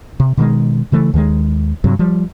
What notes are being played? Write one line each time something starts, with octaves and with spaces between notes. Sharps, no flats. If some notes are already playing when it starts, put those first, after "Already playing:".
C3
B2 D#3 G3 G#3
C#3 E3 A3
D#2 D#3 F#3 G#3
G2 C3 F#3
F3 G3